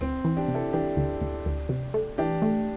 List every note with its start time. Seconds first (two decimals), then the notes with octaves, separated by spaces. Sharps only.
0.01 D2 C4
0.25 E3
0.37 D4 G4
0.48 C3
0.54 E4 A4
0.73 E3 D4 G4
0.97 D2
1.22 D2
1.46 D2
1.69 C3
1.94 A3
2.18 E3 D4 G4
2.42 A3